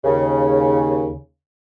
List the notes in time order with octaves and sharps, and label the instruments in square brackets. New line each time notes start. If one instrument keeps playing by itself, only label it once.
[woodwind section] D#2 C#3